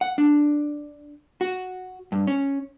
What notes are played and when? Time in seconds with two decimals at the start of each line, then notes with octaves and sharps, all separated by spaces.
0.01 F#5
0.18 D4
1.41 F#4
2.12 G2
2.27 C#4